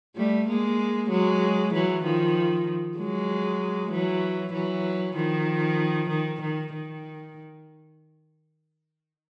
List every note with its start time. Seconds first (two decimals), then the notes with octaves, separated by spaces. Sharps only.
0.16 G3 A3
0.48 G#3 A#3
1.10 F#3 G#3
1.74 E3 F#3
2.04 D#3 F3
2.98 F#3 G#3
3.91 E3 F#3
4.53 E3 F#3
5.16 D#3 F3
6.09 D#3
6.41 D#3
6.73 D#3